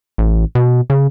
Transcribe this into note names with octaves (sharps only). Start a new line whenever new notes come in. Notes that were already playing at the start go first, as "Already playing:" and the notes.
A1
B2
C#3